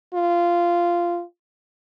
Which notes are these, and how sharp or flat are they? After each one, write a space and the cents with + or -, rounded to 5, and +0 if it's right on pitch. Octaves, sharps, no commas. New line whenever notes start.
F4 -10